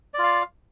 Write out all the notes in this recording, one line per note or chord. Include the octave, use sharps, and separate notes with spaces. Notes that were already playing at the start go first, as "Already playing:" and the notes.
F4 D5 F5